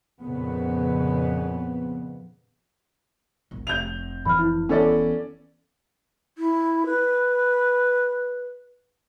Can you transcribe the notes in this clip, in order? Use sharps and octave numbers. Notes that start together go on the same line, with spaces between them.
F2 A#2 C#3 B3
E1 A#1
F1 C4 G6 F7
F2 E3 B5 F6
E4
E3 B3 C#4 A4 D5
E4
B4